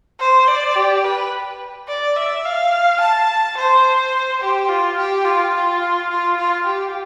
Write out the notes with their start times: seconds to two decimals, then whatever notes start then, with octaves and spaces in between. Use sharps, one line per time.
0.20 C5
0.48 D5
0.76 G4
1.04 B4
1.88 D5
2.16 E5
2.45 F5
3.01 A5
3.57 C5
4.41 G4
4.69 F4
4.98 G4
5.25 F4
5.54 F4
6.10 F4
6.37 F4
6.66 G4